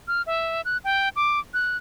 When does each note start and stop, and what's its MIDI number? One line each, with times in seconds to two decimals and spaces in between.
0.08 0.22 89
0.26 0.61 76
0.65 0.77 90
0.84 1.09 79
1.16 1.40 86
1.54 1.77 90